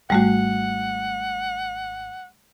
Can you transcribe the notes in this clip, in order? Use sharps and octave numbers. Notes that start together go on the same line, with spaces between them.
G#1 G3 A3 F#4 F#5